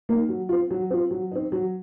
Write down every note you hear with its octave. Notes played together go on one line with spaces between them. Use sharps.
A#3 D#4
F#3
C4 F4
F#3
C4 F4
F#3
C4 D#4
F#3